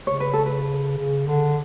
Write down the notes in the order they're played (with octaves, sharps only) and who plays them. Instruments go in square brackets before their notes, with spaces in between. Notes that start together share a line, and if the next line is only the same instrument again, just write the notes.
[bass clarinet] C#3 [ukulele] C#5
[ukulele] B4
A4
B4
[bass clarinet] C#3
D3